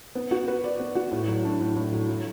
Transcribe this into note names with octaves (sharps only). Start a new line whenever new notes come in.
B3
F#4
B4
D5
B3
F#4
A2
F#3
D4
A2
A2
F#3
F#3